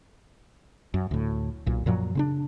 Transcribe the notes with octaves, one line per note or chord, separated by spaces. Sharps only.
F#2
D2 A2
B1 A#2
F#2 A#2 F3 F#3
C#3 C4 D4